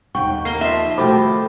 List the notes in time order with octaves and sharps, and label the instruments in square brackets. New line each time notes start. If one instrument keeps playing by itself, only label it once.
[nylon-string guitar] D#2 G5 [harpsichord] F#5 [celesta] C#6
[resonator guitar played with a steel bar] A#3 [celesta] C7 G7
[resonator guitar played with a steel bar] F3 E5
[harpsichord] D#3 A3 G4 [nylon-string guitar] F#4 G5 [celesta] C5 B5 D6